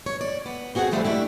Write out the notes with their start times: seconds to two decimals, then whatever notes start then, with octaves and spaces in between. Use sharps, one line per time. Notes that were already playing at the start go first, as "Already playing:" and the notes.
0.06 C#5
0.21 D5
0.46 B3
0.75 C4 F#4 G#4 A4 F#5
0.91 E3 F3 G3 A3 C5
1.04 A3 D4 E4 G4